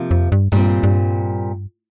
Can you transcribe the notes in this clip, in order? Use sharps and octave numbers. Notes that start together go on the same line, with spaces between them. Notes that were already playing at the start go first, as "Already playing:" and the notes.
Already playing: C3 F3 A#3
F2
G2
G2 A#2 G3 C4
G2